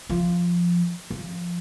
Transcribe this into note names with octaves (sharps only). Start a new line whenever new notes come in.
F3
F3